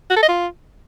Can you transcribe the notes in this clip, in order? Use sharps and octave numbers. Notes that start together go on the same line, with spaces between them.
F#4
A4
D#5
F4